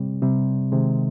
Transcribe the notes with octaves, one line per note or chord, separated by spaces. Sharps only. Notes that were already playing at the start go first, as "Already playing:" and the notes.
Already playing: C3 G3 C4
C3 G3 C4
C3 D#3 G#3